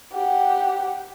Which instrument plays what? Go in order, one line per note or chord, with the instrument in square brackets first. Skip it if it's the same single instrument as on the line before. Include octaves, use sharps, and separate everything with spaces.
[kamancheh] G4 F#5